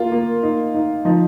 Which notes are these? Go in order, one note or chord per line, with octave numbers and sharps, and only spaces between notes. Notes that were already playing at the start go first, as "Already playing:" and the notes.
Already playing: A#3 F4
A#3
D#4
D#4
F3 D#4